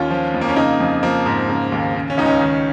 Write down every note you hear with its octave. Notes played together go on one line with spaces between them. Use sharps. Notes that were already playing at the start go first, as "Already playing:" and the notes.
Already playing: D#2 C#4 F4
F3
F2
A#3
C#4
C#3 A#3 D#4
F2
F3 A#3
G#2
C#3
D#2
C#3
C#4
C#2 D#4
C#4
D#3